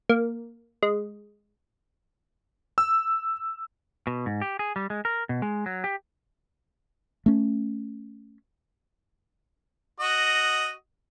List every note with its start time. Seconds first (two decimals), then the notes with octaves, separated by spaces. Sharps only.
0.09 A#3
0.83 G#3
2.78 E6
4.07 B2
4.26 G#2
4.42 G4
4.59 G#4
4.76 G3
4.90 G#3
5.05 A#4
5.29 B2
5.42 G#3
5.66 F#3
5.84 G4
7.26 A3 C#4
10.00 F#4 D#5